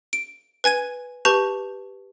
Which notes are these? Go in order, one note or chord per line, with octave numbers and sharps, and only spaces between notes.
D7
B4 G#5 G#6 D#7
G4 B4 A5 C#6 G6 F7